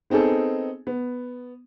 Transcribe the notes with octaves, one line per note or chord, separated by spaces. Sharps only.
B3 C4 D#4 G#4 A4
B3